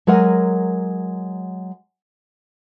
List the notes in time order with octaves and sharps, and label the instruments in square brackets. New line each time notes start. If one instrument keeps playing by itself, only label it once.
[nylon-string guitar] F#3 G#3 A#4 F#5 G#5